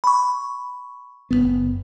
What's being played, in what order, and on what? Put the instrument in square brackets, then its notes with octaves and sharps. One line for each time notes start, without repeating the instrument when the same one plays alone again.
[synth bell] B5 C#6
[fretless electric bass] F#1 F2 B3